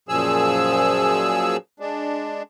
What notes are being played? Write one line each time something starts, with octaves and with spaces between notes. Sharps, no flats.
F#2 A#2 F3 G#4 E6
G#3 D4